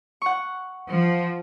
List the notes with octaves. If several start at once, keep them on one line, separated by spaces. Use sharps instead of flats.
F#5 C#6
F3